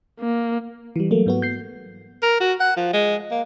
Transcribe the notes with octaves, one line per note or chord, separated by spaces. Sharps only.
A#3
E3 G3
F#3 A3 A#3
G#2 B3 F#4
G6 C7
A#4
F#4
F#5
F3
G#3
A#3